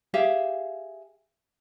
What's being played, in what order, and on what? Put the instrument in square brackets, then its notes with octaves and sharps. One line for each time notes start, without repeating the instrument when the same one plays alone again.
[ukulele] G4 G#4 E5 F5